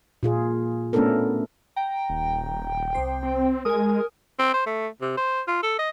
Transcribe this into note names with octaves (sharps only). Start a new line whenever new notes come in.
A#2 F4 G#4
A3 B3 C#4 D4 A4 A#4
G5 A#5
D#1
C2 C5
C4
G#3 A#4 G#5 D#6
C4
C5
A3
C3
C5
F4
A4
D#5